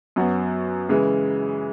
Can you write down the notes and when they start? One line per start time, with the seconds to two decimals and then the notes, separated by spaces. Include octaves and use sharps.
0.16 F#2 F#3 B3
0.89 C#3 E3 G#3